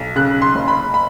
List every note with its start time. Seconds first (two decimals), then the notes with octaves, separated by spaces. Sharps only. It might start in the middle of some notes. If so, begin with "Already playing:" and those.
Already playing: B1
0.16 C#3 F#6
0.42 C6
0.55 F#1
0.68 B5
0.94 B5